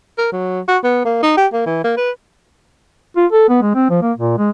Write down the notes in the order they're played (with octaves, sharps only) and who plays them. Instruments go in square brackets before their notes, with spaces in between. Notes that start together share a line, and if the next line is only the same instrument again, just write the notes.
[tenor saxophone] A#4
F#3
F#4
B3
A#3
D#4
G4
A#3
E3
A#3
B4
[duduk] F4
A4
B3
G#3
C4
F3
A#3
A#2
G#3